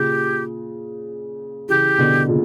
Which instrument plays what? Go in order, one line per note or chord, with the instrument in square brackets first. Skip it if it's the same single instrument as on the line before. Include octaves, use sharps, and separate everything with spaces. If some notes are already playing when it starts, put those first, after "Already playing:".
Already playing: [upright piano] A#2 C#3 [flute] G4
[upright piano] C#3 E3 [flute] G4
[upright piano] B2 D3
A#2 C#3